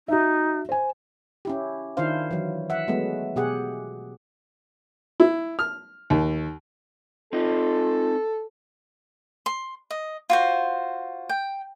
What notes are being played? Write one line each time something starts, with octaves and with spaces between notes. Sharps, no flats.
D#4 F#4 E5
C5 G#5
C#4 E4 G4
D#3 D4 E4 F4 C5 F5
E3 F#3
E5 F#5
F#3 G#3 A3 B3
B2 G4 G#4 F#5
E4
F6
D#2
C4 D#4 F4 A4 D#5
C6
D#5
F4 F#4 C5
G5